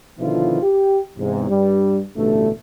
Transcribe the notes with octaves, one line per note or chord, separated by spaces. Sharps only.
B2 D3 D#3 F3 E4 F4
G4
E2 G#2 C3
G2 G3
A1 G2 B2 D3 A3